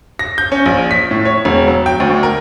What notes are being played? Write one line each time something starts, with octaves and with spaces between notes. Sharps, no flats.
A#6
G6
C#4
A#1
B6
A2
C#5
E1
F#3
G5
D2
A#4